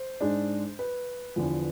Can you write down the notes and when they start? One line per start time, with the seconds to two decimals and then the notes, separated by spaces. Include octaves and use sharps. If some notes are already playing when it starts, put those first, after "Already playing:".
Already playing: C5
0.21 G#2 G#3 D4
0.79 B4
1.36 E2 D3 F3